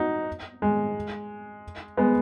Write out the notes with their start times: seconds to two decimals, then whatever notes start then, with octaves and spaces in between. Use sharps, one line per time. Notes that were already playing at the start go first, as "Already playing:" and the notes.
Already playing: D#4 F#4
0.62 G#3
1.97 G#3 B3